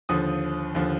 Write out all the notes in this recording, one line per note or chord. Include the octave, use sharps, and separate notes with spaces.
D#2 D3 F3 D#6
D#2 D3 F3